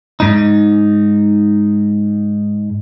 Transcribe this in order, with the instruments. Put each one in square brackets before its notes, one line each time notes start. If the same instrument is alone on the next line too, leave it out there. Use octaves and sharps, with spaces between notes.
[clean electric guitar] G#2 D#4